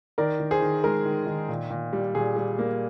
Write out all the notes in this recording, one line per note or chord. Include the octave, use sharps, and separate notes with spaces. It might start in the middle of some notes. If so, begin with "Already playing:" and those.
D#3 A#4 D5
D#3
G#4 C5
D#3
G#3 A#4
D#3
D#3
A#2
A#2
G3
A#2 G#4
G3
A#3